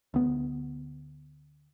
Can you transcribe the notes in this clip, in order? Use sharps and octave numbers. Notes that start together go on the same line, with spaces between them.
D2 B3